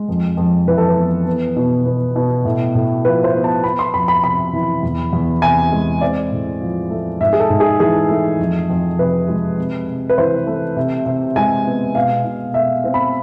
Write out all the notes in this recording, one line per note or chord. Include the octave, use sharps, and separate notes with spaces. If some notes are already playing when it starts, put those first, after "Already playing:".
Already playing: G#3
F2
F2
E3 B4
A4
B4
B3
B3
B2
B3
B2
A2
A2
F3 B4
C5
B3
A5
B3 B5
C6
F2 B5
B5
C3 B5
E3
E2
E2
C3 G#5
G#3
C4 D5
A2
F3
A3
G#2 E5
G#4
A4
G#2
G#4
E3 G#4
A3
F2
F2
C3 B4
G#3
C3
C3
B4
E3 C5
A3
C3
C3
G#3 G#5
B3
B2 F5
B2
A3 E5
C4
B5